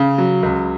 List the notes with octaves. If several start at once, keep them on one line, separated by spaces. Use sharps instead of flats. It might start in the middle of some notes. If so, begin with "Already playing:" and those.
Already playing: C#3
F#3
C#2